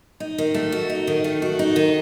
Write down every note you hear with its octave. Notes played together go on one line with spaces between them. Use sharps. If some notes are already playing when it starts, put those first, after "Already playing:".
D#4
D#3
A3
F#4
D#4
D#3
A3
F#4
D#4
D#3